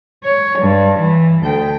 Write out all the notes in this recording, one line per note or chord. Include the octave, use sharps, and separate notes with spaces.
C#5
G2
E3
D2 G5